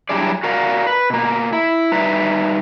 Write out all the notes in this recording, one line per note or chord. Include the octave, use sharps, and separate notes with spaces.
F#3 G3 D4 E4 G#4 D5
F#4 A#4 D5 F5 F#5
B4
B2 A#3
E4
G3 D#4 B4 E5